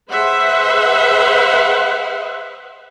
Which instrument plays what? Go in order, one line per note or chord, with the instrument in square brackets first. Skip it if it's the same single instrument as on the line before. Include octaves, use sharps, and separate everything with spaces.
[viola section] G#4 B4 C5 E5 F#5